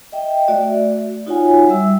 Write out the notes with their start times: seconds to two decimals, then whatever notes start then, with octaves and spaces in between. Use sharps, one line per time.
0.12 D#5 E5 G5
0.48 A3 F#4 D5 E5
1.26 D#4 F4 F#4 C#5 F#5 G#5
1.68 G3 E5 E6